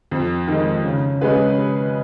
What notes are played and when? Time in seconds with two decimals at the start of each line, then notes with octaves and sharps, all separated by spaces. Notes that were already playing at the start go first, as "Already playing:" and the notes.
0.11 F2
0.48 D#3 G#3
0.85 C#3
1.21 G#3 C#4 G#4 B4